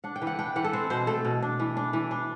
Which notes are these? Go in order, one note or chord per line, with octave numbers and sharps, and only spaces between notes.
D4 F#5
G5
E3
F#5
D4 G5
E3 F#5
A4
C4 C5
B2 C5
A3 A4
B2
D4
E3
D4
E3
D4